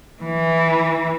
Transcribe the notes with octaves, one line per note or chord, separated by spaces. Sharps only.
E3